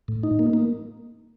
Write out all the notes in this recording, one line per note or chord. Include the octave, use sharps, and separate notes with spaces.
A2
D#4
A#3
A#3